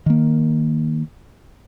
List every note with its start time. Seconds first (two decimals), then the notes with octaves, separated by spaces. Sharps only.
0.06 D#3 A#3